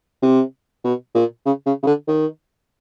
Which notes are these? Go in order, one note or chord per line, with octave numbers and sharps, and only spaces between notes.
C3
B2
A#2
C#3
C#3
C#3
D3
D#3